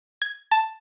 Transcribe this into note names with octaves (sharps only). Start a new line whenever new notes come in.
G#6
A5